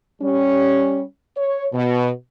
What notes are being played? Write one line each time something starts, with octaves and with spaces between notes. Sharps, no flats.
G3 C#4
C#5
B2